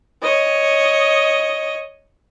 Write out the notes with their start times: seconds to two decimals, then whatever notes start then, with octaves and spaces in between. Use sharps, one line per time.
0.22 C#5 D#5